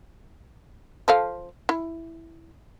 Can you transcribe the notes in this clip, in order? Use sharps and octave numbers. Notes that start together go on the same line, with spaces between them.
F3 A4 F5
E4